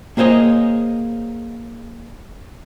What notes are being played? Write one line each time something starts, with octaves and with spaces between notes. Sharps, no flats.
A#3 G#4 C5 C#5 D#5